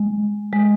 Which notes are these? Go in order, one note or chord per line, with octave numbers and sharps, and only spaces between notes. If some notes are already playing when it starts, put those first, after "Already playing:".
Already playing: G#3
G#3